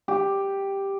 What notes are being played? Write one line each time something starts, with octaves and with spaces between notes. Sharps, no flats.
G4